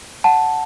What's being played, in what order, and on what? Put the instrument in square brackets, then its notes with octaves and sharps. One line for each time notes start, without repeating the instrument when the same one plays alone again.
[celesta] F#5 A5